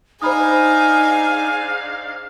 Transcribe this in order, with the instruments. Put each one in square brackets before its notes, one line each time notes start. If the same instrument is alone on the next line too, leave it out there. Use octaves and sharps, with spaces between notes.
[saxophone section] G#2 D4 F5 [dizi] D#4 [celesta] C5 B5 D#6 [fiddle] G#5